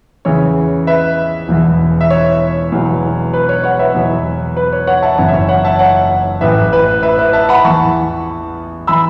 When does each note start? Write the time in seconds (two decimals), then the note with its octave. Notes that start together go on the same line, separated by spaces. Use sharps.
0.25 E2 C#3 E3 C#5
0.87 B4 E5
1.48 E1 E2 E3
2.01 E5
2.10 C#5
2.72 E1 E2 B2 F#3
3.34 B4
3.49 C#5
3.64 C#5 F#5
3.79 B4 E5
3.95 E2 B2 F#3
4.57 B4
4.73 C#5
4.87 C#5 F#5
5.03 E5 A5
5.18 F#1 F#2 E3 C#5
5.28 E5
5.34 C#5
5.49 C#5 F#5
5.65 E5 A5
5.79 C#5 F#5
6.41 A1 A2 E3 B4 E5
6.73 B4
7.03 B4 E5
7.18 B4 E5
7.33 E5 A5
7.49 F#5 B5
7.64 E2 E3 A5 C#6
8.87 E3 B5 E6